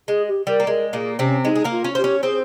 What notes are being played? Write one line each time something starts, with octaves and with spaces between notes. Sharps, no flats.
G#3 G#4
G4
G3 A#4
A#3
G#3 A#4
A#2 A#3 G#4
C3 C4 C#4
G#3 D#4 G#4
G#4
A#3 A#4
F4
C#4 C#5
G4 C5
C#4 C#5
C4 G#4 C5